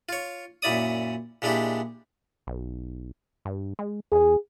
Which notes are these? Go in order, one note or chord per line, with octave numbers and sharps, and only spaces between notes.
F4 C#5
F#2 A#2 E4 D5 D#6
A#2 G#3 D4 E4 G4
B1
G2
G#3
E2 G#4